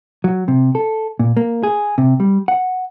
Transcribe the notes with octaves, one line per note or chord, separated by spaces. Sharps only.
F#3
C3
A4
A#2
A#3
G#4
C3
G3
F#5